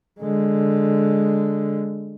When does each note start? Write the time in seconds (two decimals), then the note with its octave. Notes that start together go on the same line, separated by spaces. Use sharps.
0.19 D3 G#3